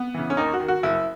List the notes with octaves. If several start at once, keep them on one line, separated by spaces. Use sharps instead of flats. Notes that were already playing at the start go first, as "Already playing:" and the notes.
Already playing: B3
C#3 E3
C#4
D#2 D#4
F#4
D#3
F#4
F#1 E4